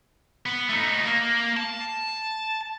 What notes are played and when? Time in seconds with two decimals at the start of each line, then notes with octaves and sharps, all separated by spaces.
0.46 B3
0.69 A3 D#4
1.05 A#3
1.57 A5